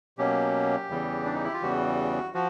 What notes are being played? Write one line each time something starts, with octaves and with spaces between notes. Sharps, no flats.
B2 F#3 A#3 C#4 G4
E2 C#3 E3 G3
D4
D#4
E4
F4
E2 C#3 E3 G3 F#4
F3 F#4